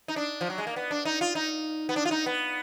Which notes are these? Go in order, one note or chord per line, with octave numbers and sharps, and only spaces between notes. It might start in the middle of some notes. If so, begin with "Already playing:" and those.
D#4
D4
F3
F#3
G#3
A#3
B3
D4
D#4
F4
D#4
B3
D4
F4
D#4
B3